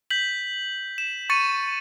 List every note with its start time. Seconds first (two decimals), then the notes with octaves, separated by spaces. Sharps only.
0.10 G6 B6 F#7
0.98 E7
1.30 C#6 A6 C#7 D#7